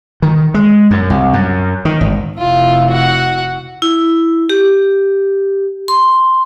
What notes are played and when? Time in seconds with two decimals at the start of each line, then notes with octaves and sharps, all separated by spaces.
0.22 D#3
0.54 G#3
0.91 F#2
1.10 C2
1.33 F#2
1.85 D#3
2.01 G#1
2.38 F1 E4 F4
2.89 F#4 F#5
3.82 E4
4.49 G4
5.88 C6